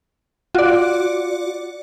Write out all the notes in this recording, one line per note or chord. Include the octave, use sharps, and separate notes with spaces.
F4 F#4 D5